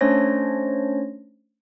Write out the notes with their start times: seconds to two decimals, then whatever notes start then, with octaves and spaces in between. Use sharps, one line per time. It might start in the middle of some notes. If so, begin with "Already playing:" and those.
0.01 A3 C#4 D4 C5 C#5 A#6